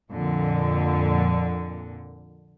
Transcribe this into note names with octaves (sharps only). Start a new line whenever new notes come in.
F2 A#2 D3